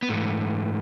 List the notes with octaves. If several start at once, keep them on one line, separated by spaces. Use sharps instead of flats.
B3
G#2 E3 A3